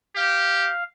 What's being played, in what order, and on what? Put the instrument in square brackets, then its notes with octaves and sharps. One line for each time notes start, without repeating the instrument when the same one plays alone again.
[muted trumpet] G4 [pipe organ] F5